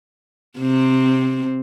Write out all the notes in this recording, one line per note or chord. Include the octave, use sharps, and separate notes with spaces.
C3 C4